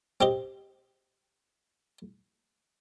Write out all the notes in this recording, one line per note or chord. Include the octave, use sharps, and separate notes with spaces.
C4 G4 D#5